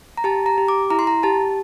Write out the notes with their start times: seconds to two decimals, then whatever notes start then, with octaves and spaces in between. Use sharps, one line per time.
0.17 A#5
0.24 G4 A5
0.46 A#5
0.58 G4
0.68 D6
0.90 E4 A#5
0.99 C6
1.07 A#5
1.23 G4 A5